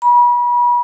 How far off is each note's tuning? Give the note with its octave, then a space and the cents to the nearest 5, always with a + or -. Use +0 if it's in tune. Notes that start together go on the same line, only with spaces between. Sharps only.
B5 -35